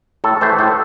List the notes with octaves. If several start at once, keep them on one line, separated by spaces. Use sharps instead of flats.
A2 A4
E3 A3 C5
A2 A4